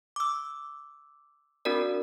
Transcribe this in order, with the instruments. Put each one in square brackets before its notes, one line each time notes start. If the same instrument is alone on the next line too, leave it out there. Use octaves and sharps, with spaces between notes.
[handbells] D6 E6
C4 D4 F#4 A#4 D5